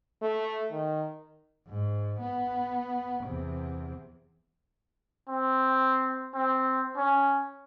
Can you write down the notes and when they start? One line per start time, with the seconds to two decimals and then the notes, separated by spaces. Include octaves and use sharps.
0.22 A3
0.71 D#3
1.68 G#2
2.20 B3
3.24 E2 C3
5.29 C4
6.34 C4
6.97 C#4